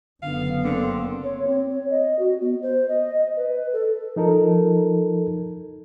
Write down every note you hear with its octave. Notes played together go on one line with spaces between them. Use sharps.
F#1 D3 B3 F5
D3 A#3 C4
C#5
C4
C#5
D#5
F#4
B3
C5
D#5
D#5
B4
A4
F3 D#4 A4 A#4